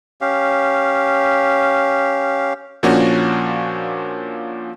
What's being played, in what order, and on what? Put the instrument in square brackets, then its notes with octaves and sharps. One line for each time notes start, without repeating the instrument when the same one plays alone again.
[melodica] C#4 G4 F5
[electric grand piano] A#2 F3 A#3 C#4 D4 F#4